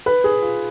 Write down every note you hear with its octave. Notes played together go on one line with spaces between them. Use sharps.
B4
G#4
F4